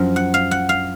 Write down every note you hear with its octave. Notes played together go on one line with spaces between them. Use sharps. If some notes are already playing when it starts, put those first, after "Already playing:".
Already playing: F#2 F3
F#5
F5
F#5
F5